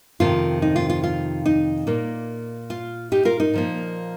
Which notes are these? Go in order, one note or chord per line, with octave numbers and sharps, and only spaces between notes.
F2 C3 D#3 C4 F4
D#4
F4
F4
F4
D#4
A#2 A#3
F4
D#4 G4
F4 A#4
D#4
A#2 F3 A#3